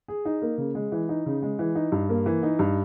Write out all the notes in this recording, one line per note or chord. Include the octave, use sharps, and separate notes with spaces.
G#4
D#4
A#3
C#3
G#3
E3
D#4
C#3
G#3
E3
D#4
G2
A#3
E3
D#4
G2